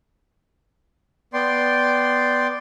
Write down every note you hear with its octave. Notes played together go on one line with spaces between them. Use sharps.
B3 D5 G5 C6